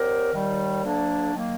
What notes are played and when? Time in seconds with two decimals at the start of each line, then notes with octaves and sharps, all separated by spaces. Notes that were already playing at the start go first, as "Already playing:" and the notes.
Already playing: F#3 C4 G4 A#4 D5
0.32 D#2 D#3 G3
0.83 D2 D3 F#3 A#3 D4
1.33 D#3 F#3 A#3